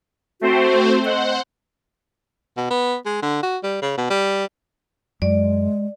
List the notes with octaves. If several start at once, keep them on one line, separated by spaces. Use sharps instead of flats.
A3 C4 F#4 C5
C5 D#5 F#5
B2
B3
G#3
D3
F#4
G3
C#3
B2
G3
F#2 G#3 D5